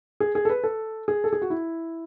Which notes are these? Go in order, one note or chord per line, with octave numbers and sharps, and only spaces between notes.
G#4
G#4
A4
B4
A4
G#4
A4
G#4
F#4
E4